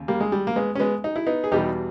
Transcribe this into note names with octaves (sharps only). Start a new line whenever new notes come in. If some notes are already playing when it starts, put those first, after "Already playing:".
Already playing: D#2 C#3
G3 A#3
G#3
G3
A#3
G#3 B3
C#4
G#3 B3
D#4
E4
B3 D#4
G#4
E2 B2 G3 D#4 G4